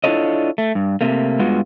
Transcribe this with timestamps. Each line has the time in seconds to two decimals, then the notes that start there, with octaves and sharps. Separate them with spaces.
0.04 D4 E4 F4 A4 C#5 D#5
0.58 A3
0.75 G2
1.01 C3 A3 A#3
1.39 G2 G#3 B3 F4 F#4